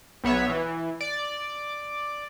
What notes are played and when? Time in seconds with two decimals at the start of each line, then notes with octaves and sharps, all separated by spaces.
0.24 B1 B3 C#5 E5
0.50 E3
1.01 D5